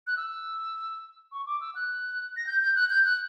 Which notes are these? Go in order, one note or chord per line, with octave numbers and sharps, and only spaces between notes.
F#6
E6
C#6
D6
E6
F#6
A#6
G6
G6
F#6
G6
F#6